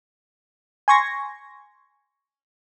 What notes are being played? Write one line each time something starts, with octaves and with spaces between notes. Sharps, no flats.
G#5 C6 C#6 G#6 A#6